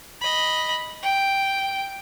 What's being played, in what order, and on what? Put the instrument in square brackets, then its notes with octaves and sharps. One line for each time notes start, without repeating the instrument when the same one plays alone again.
[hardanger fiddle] D#5 B5
G5